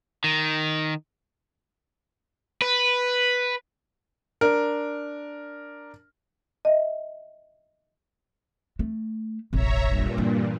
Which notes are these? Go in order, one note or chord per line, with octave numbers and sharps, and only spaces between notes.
D#3
B4
D4 A#4
D#5 E5
A3
E1 A1 C#5 E5 A#5
G2 A#2
E3